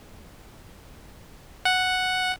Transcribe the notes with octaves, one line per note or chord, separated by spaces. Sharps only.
F#5